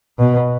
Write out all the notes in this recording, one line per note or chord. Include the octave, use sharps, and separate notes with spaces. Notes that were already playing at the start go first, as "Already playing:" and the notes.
B2